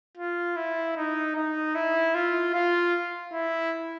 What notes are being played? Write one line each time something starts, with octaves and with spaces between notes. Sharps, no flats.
F4
E4
D#4
D#4
E4
F4
F4
E4